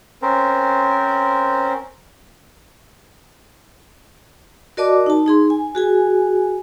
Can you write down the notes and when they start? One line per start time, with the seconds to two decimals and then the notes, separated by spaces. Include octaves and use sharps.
0.22 C4 C#4 A#4 C5
4.77 F#4 A#4 D5 D#5 A5 D6
5.06 D#4 A5
5.26 D#4 G#4 C6
5.50 G#5
5.75 F#4 G#4 G#5